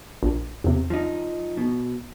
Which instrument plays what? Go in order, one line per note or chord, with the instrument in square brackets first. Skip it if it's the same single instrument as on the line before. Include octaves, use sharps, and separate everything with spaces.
[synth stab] A#1
E2 C3
[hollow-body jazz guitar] F3 D#4
B2